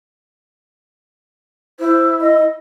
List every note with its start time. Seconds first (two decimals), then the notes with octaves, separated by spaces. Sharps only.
1.80 E4 C5
2.21 D#5